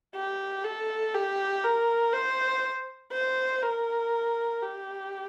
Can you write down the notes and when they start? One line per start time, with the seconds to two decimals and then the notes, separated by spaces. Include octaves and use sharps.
0.15 G4
0.64 A4
1.14 G4
1.64 A#4
2.13 C5
3.13 C5
3.62 A#4
4.62 G4